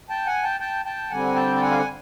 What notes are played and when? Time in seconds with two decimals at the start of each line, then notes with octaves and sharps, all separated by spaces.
0.09 G5 A5
0.27 F#5 G#5
0.43 G5 A5
0.60 G5 A5
0.85 G5 A5
1.10 D3 G3 C4 F#5 G#5
1.36 G5 A5
1.56 A5
1.62 F#5 G#5
1.70 F5
1.78 F#5